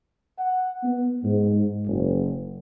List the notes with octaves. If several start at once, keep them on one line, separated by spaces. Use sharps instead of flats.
F#5
B3
G#2
F#1